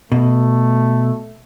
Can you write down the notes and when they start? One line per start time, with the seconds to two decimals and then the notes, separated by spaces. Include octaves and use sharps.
0.12 B2 A3